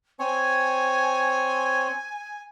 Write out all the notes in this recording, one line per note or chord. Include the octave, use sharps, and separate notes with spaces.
C4 C#5 G#5